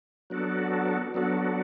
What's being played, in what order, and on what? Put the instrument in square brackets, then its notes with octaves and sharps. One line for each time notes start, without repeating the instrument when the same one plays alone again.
[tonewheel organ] F#3 B3 D4 F#4 A4
F#3 B3 D4 F#4 A4